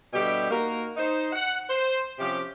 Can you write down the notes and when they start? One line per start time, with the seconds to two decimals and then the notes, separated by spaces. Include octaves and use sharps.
0.14 B2 D3 G3 G4 E5 G5
0.51 A#3 D#4 F#4 A#4
0.96 D#4 C5
1.33 F#5
1.70 C5
2.19 C3 F3 C#4 G4